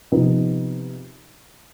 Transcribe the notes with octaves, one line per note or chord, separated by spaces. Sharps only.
C3 F3 B3 D#4